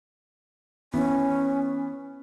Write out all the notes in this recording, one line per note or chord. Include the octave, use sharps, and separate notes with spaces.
E3 B3 C#4